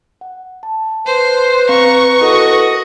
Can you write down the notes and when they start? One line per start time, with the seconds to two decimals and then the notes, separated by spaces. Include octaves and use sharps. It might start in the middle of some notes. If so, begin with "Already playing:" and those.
0.21 F#5
0.63 A5
1.06 B4 C5
1.69 C4 F5 A#5 C#6
2.21 E4 F#4 A4 A#4 D#5